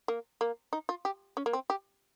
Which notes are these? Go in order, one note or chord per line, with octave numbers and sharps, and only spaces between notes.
A#3
A#3
D#4
F4
G4
C#4
A#3
C4
G4